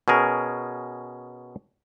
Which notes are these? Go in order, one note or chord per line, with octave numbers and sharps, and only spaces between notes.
B2 C#4 G#4 A#4